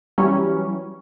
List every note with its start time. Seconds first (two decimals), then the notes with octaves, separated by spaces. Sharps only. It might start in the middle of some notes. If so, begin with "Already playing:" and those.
0.18 E3 F#3 G3 C#4